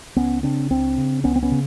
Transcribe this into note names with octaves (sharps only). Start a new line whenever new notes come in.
C#2 B3 C#4
C#3 C4 D4
C#2 C4 D4
C#3
C#2 B3 C#4
C4
B3 C#4
C#3